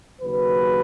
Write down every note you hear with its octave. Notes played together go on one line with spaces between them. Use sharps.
D#2 C#3 F#3 B4